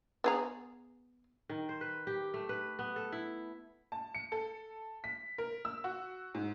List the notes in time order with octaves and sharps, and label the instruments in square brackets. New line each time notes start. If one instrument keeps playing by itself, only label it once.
[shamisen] B3 G#4 A#5
[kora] D#3
C5
B4
G4
A3
B4
B3
A4
E4
[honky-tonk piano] A5
C#7
A4
B6
A#4
E6
F#4
G#2